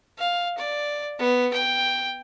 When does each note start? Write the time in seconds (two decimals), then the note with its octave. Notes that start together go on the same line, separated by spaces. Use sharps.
0.18 F5
0.58 D5
1.19 B3
1.53 G5